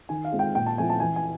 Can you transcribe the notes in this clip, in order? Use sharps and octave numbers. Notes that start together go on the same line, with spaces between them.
D#3 G#5
F5
G#3 C4 F4
G5
A#2 G5
A5
F3 A3 C4 E4 G#5
A5
E3 G#5
G#5